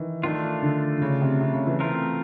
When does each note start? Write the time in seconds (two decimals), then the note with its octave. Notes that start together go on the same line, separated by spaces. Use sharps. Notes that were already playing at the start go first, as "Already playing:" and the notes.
Already playing: D#3 E3
0.23 D#3 A3 D4 F4
0.62 D3
0.98 D3
1.02 C#3
1.22 C3
1.41 C3
1.53 C#3
1.66 E3
1.80 A3 C4 F4 A#4